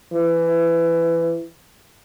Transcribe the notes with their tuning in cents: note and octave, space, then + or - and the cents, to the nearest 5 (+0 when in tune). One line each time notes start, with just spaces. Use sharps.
E3 +20